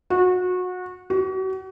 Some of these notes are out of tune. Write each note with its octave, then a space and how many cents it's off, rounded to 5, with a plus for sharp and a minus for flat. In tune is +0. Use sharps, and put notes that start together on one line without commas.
F#4 -25
F#4 +40